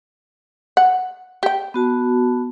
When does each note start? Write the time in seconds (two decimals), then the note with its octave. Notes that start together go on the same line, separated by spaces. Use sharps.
0.77 F#5
1.43 G4 G5
1.74 B3 F#4 A5